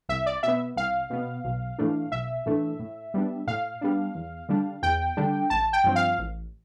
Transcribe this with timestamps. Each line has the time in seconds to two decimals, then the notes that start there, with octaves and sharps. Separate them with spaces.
0.09 C2 E5
0.26 D5
0.43 B2 B3 E5
0.76 C2 F5
1.10 B2 B3
1.44 B1
1.78 A2 E3 A3 D4
2.12 B1 E5
2.46 A2 E3 A3 D4
2.79 A2
3.14 G3 B3 D4
3.47 A2 F5
3.81 G3 B3 D4
4.15 E2
4.49 D3 G3 D4
4.82 E2 G5
5.17 D3 G3 D4
5.50 A1 A5
5.73 G5
5.84 G2 F3 C4
5.96 F5
6.18 A1